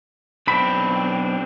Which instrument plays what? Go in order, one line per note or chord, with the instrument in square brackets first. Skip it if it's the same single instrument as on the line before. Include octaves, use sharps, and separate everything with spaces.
[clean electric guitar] B1 B5 [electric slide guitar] C4 D4